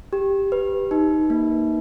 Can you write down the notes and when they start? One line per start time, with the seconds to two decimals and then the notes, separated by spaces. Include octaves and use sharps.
0.13 G4
0.52 B4
0.91 D#4
1.30 A#3